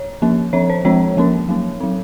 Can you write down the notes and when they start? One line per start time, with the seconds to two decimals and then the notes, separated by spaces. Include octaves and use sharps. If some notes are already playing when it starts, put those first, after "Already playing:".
Already playing: C#5
0.22 F3 A#3 C#4
0.53 F3 C4 C#5
0.70 C5
0.85 F3 G#3 C4 C#5
1.17 F3 A#3 C#4
1.49 F#3 A#3 C#4
1.80 F#3 C4